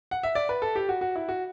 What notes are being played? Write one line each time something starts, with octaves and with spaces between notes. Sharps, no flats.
F#5
E5
D5
B4
A4
G4
F#4
F#4
E4
F#4